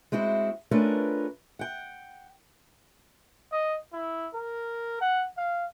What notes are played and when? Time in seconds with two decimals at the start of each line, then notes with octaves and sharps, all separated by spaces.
0.12 G#3 C4 E4 F#4
0.71 A3 C#4 D4 F4 A#4 B4
1.59 F#5 G5
3.52 D#5
3.93 E4
4.34 A#4
5.01 F#5
5.37 F5